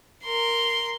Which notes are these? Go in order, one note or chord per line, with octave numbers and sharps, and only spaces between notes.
A#4 C6